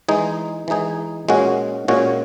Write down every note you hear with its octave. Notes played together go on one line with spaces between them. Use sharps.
E3 G#3 D#4 G#4
E3 G#3 D#4 G#4
A#2 G#3 C#4 F#4
A#2 G#3 C#4 F#4